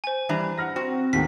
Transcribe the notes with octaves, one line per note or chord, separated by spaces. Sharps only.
C5 G#5
E3 G3 D4 A#5
F#5 F6 A#6
C4 F#4
D#2 A2 F#3 B6